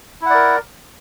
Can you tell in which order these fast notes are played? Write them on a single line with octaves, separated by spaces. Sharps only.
E4 F#5 D5 A#4